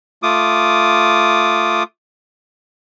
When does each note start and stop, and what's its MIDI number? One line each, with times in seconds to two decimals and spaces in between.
0.23 1.83 57
0.23 1.83 65
0.23 1.83 86
0.23 1.83 87